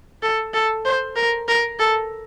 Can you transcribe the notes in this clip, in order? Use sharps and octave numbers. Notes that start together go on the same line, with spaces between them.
A4
A4
C5
A#4
A#4
A4